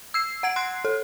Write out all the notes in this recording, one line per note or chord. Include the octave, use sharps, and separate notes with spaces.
E6 C7
F#5 G#6 D7
C6 F#6 C7
A4